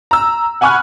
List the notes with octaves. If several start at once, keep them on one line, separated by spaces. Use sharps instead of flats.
A#5 E6
F#5 G#5 B5 C#6 F6 F#6